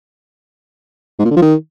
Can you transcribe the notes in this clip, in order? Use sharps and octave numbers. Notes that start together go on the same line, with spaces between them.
G#2
A#2
D3
F3
D#3